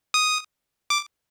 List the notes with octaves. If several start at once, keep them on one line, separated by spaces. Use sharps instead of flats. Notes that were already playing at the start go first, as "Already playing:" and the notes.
D#6
D6